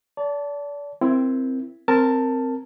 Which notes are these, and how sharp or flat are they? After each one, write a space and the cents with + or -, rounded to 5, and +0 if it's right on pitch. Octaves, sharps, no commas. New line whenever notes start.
D5 -35 A5 +0
C4 +0 E4 +20 A#4 +0
C4 +0 A#4 -10 A5 +10